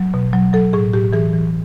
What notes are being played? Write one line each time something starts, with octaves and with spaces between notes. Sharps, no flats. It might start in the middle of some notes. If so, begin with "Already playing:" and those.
Already playing: F#3
B2
F#3
F#3 A4
A2 G#4
A2 G4
E3 G#4
E3